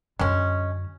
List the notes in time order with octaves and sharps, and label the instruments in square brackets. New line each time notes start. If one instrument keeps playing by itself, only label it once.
[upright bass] F#2 D3 [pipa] G#3 C#4